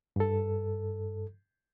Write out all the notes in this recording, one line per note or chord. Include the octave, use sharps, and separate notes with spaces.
G2 A4